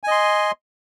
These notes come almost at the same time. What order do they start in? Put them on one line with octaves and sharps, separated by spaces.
G#5 D#5 C6